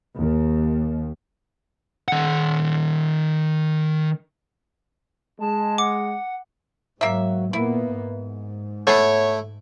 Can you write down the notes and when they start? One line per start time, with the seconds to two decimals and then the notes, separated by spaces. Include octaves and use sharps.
0.19 D#2
2.08 D#3 F#5
5.40 G#3 A5
5.78 F#5 D6
7.01 G#2 F#3 A#3 E5
7.53 A#2 A#3 B3 E4
7.94 G#2
8.87 A3 B3 E4 G#4 C#5